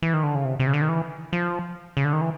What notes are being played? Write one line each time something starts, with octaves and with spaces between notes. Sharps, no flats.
E3
D#3
D3
C#3
C3
C3
C#3
D3
D#3
E3
F3
C#3
D3
D#3
E3